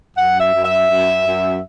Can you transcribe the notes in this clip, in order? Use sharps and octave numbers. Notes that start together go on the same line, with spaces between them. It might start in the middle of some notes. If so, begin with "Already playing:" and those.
F#2 F#5
E5
F#2
E5
F#2
F#2